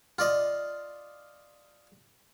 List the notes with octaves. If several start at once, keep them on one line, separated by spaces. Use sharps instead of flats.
F4 D5 D#5